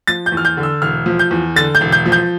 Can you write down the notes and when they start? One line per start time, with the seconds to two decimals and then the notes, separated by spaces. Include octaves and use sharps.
0.07 F3 A6
0.26 G6
0.32 E2
0.37 F6
0.45 G6
0.57 D3
0.63 E6
0.82 E1 F6
1.06 F3
1.19 G6
1.31 E2
1.56 D3 A6
1.75 G6
1.81 E1
1.92 G6
2.06 F3
2.12 G6